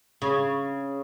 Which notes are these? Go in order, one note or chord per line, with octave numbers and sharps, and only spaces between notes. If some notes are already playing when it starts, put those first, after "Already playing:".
C#3